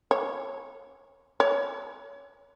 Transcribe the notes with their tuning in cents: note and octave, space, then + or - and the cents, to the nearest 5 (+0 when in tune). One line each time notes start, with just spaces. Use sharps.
C#5 -20
C#5 +20